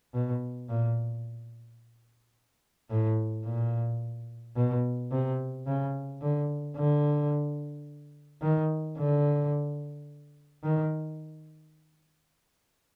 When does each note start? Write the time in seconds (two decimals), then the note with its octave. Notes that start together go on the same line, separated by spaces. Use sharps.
0.14 B2
0.69 A#2
2.90 A2
3.45 A#2
4.56 B2
5.11 C3
5.66 C#3
6.22 D3
6.77 D3
8.42 D#3
8.98 D3
10.63 D#3